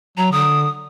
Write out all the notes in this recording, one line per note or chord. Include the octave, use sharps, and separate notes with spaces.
F#3 A#5
D3 D#6